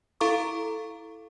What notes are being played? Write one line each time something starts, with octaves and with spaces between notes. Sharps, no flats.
E4 A4 F5 A#5 C#6 D6